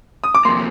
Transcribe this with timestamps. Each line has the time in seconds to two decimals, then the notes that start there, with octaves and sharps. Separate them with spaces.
0.24 D#6
0.35 D6
0.45 C3 F3 A#3 C6